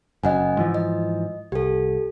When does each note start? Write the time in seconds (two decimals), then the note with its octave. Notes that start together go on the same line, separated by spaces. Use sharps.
0.23 F#1 F#2 D#5 F#5 G#5
0.57 G#2 E3 F3
0.74 D#5
1.52 C2 G4 A4